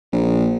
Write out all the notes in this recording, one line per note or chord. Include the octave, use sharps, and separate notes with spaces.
A#1